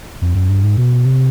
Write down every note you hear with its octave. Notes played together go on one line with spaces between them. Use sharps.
F2
F#2
G2
G#2
B2
C3